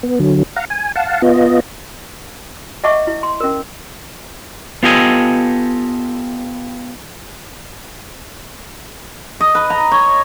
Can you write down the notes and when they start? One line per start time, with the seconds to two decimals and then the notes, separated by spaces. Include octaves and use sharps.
0.03 B3
0.20 D3 F#3
0.56 F5 F#5 A#5
0.70 G#5
0.96 F5 F#5 A5
1.22 B3 F4 D#5
2.84 D#5 E5 F#5 A5 C#6 D6
3.07 E4
3.23 C6
3.40 C#4 A#4
4.83 B3 F4 G4 A4 D#5 G#5
9.41 D#5
9.55 B4
9.70 A#5
9.92 C#5